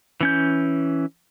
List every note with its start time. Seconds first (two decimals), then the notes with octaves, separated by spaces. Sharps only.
0.21 E3 C#4 G6